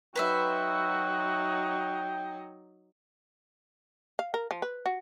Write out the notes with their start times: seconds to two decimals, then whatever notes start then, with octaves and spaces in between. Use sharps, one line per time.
0.16 F#3 D#4 F#4 B4 C5 E5 G5
4.19 F5
4.34 A#4
4.51 F3
4.62 B4
4.86 F#4